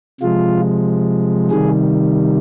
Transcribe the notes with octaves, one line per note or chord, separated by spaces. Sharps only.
C3 F3 G#3 F4
C3 D#3 G3 G#4